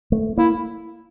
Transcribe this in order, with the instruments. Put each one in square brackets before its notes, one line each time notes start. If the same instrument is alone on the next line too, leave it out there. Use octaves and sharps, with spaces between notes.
[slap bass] A3
[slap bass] A#3 [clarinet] E4